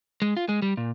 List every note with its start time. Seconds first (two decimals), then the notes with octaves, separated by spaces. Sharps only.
0.22 G#3
0.37 F4
0.49 G#3
0.62 G3
0.77 A#2